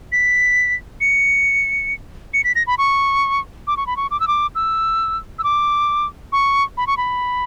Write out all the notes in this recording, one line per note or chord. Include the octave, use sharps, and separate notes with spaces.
B6
C#7
C#7
B6
A#6
B5
C#6
D6
C#6
B5
C#6
D6
E6
D6
E6
E6
D6
C#6
B5
C#6
B5